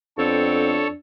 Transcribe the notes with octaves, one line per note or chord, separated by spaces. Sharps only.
F2 B3 C4 D4 A4 C#5